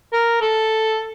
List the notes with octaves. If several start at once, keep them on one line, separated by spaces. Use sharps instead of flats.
A#4
A4